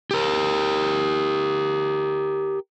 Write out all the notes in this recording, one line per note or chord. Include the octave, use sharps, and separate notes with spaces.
G4 A#4